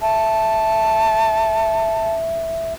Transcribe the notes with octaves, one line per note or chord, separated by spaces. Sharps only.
E5 A5